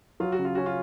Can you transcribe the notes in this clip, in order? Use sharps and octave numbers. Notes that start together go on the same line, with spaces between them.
F#3 F4
F#4
C#3
F4
C#4 F#4
F4